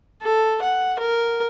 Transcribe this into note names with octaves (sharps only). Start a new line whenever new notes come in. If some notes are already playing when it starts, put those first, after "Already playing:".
A4
F#5
A#4